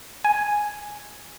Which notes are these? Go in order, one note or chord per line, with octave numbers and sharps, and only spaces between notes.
G#5